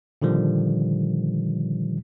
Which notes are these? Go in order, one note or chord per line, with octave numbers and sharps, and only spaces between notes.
A#2 D3 D#3 F3 G3